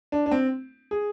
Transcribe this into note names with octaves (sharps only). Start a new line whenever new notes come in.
D4
D4
C4
G#4